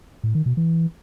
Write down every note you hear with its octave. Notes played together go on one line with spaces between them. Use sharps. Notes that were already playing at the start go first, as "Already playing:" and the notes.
A2
D#3
B2
E3